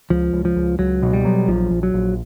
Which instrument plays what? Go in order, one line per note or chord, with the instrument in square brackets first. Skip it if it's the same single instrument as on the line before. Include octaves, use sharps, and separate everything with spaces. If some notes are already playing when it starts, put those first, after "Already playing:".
[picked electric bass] C#2 [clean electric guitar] F3
[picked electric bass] C#2
[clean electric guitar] F3
[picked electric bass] C#2
[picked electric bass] C#2 [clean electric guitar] F#3
[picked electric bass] B2
[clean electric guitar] G3
[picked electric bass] F#3
[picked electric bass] A#1 [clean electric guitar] F3
[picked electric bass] A#1
[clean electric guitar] F#3
[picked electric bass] A#1